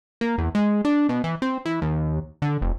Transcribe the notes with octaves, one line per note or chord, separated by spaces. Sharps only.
A#3
E2
G#3
D4
B2
E3
C4
E3
D#2
D3
F1